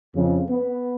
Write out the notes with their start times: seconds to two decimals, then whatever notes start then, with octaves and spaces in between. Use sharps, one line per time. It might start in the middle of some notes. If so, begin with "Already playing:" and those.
0.15 F2 C#3
0.49 B3